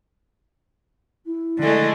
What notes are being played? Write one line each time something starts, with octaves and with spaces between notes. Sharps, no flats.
E4
D3 G#3 A3